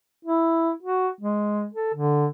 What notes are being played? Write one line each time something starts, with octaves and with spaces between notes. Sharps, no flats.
E4
F#4
G#3
A4
D3